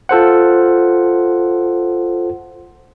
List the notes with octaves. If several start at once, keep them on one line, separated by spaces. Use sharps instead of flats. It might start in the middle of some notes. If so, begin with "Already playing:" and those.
F4 A4 C5 F#5